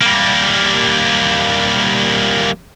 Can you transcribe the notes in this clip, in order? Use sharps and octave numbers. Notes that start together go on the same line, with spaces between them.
G3 A#3